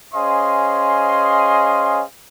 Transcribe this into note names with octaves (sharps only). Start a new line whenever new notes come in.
C#4 G#4 C5 D#5 F5 C6